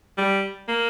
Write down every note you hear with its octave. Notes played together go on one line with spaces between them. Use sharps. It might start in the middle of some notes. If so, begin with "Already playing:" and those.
G3
A#3